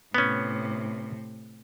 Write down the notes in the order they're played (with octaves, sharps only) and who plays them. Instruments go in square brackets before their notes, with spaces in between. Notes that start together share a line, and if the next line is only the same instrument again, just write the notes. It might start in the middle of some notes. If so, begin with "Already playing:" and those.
[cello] A2 C3 [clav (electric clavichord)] B3 C#4